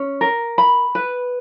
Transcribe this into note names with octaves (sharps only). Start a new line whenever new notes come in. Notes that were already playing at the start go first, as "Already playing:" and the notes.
Already playing: C#4
A#4
B5
B4